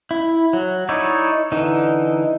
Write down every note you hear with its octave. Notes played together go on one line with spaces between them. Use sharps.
E4
F#3
D#4 E4 C#5 D5
D3 E3 D#4